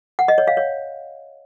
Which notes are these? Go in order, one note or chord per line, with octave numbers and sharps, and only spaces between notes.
F#5
D#5
C#5
F5
C#5